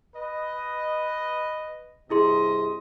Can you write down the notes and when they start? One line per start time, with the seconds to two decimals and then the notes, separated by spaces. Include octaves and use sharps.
0.16 B4 D#5
2.10 G2 C3 E4 G#4 D#5 C6